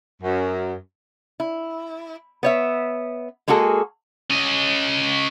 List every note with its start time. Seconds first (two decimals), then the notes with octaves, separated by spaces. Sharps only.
0.21 F#2
1.40 E4
2.43 B3 C#5 E5
3.48 G#3 A#3 F#4 G#4 A4
4.30 C#4 D#5